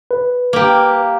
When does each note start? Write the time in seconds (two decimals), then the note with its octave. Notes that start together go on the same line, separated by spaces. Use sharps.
0.11 B4
0.53 A#3 G4